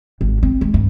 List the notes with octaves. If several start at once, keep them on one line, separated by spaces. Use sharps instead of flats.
G#1
C4
G#3
G2